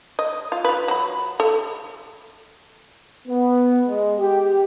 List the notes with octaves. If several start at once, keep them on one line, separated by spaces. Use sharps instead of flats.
D#5
F4
F4 B4
F#3 B5
A4
B3
G#3
G4